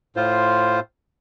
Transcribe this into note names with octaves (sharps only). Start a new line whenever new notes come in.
A2 F4 C5